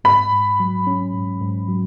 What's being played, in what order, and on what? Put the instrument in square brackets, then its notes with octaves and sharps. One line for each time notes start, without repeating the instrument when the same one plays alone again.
[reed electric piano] G#2 [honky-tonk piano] B5
[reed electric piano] G#2
F#3
C#4
G#2
G#2
F#3